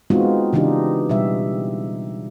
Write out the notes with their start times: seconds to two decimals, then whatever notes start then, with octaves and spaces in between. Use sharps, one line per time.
0.10 G#3 B3 C4 D#4 F4 F#4
0.53 C#3 E3 D4 D#4 G4
1.10 B2 G3 E5